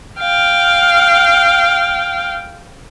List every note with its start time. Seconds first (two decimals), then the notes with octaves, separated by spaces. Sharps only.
0.19 F5 G5